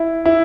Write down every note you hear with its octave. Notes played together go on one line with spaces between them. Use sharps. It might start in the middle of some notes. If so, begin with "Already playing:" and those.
Already playing: E4
E4